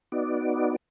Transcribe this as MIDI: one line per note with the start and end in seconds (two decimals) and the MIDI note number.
0.12 0.76 59
0.12 0.76 63
0.12 0.76 66
0.12 0.76 74